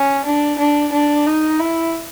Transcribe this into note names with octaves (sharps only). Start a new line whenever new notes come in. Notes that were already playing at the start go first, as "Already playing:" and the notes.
Already playing: C#4
D4
D4
D4
D#4
E4